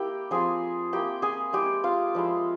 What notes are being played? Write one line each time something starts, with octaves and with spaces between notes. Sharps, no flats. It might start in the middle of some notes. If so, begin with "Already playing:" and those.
Already playing: A#3 E4 G4 G5
F3 C4 F4 G#4 G#5
A#3 E4 G4 G5
G#4 G#5
G#3 E4 G4 G5
F4 F5
F3 G#3 E4